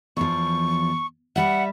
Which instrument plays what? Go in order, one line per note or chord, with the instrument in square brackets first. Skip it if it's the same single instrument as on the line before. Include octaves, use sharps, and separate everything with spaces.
[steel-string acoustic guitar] E2 F3 [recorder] C#6
[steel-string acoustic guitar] G3 E5 [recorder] F#5